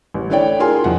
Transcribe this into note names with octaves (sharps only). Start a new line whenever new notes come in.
A1
A3 D4 E4 C#5 D5 G5
F4 F#4 G#4 A#4 G#5 C6
F2 F3 F#5